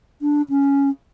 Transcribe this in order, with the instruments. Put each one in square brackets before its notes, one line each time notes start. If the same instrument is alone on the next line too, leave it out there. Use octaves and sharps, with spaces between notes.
[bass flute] D4
C#4